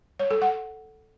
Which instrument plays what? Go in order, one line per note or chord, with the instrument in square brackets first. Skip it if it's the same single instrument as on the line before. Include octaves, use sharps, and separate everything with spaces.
[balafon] C#5
A4
F#5